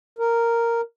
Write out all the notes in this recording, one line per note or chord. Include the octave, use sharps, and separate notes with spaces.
A#4